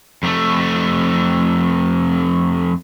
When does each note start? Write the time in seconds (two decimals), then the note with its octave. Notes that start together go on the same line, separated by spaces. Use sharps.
0.23 F2 A3